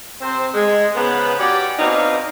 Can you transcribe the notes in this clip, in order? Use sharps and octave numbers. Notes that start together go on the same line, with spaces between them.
C3 C4 C5
G#3
G#2 C#3 B3
C#4 F#4 G4 D5
B2 C4 D4 D#4 F5